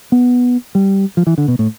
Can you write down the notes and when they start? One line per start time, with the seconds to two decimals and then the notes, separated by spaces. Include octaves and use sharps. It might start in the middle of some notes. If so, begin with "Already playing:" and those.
0.12 B3
0.75 G3
1.17 F3
1.27 E3
1.38 D3
1.48 B2
1.59 A2